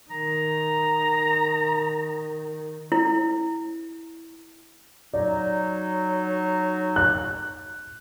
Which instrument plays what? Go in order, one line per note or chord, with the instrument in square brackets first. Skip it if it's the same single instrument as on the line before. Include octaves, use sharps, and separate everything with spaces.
[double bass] D#3 [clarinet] A#5
[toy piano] E4
[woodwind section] F#3 D#4 [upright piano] D5
[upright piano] F#6